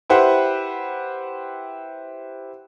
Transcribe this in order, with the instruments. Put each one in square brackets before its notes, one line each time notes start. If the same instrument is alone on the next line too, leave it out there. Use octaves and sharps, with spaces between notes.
[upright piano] E4 G4 B4 C5 F#5